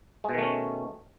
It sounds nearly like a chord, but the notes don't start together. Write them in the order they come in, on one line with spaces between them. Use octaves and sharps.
G#3 B2 D#3 A3 C#4